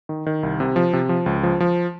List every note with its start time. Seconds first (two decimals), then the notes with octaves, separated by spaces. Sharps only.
0.09 D#3
0.26 D#3
0.43 C2
0.60 C3
0.76 F3
0.93 C3
1.09 F3
1.26 C#2
1.43 F3
1.60 F3